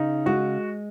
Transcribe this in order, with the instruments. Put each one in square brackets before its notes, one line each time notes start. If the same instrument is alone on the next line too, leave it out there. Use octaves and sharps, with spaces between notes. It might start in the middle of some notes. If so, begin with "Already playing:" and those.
Already playing: [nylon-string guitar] C#3 [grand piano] D#4
[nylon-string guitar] G#3 [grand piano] F#4